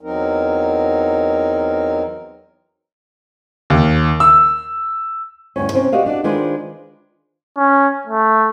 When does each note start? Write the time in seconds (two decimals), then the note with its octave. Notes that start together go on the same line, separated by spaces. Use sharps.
0.01 E2 F#3 C4 D#4 A#4
3.70 D#2
4.20 E6
5.56 D2 G2 C#4
5.73 C3 C4 C#4
5.92 F#4 G4 D5 D#5 F5
6.06 D4 F#4 D5
6.24 D#3 G#3 D4 F4 B4 C5
7.58 C#4
8.07 A3